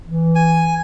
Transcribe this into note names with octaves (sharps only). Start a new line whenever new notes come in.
E3
G#5